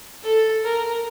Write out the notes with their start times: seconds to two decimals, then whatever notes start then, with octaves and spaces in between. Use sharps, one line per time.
0.23 A4
0.64 A#4